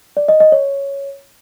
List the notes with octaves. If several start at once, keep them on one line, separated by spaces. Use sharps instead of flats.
D5
D#5
D#5
C#5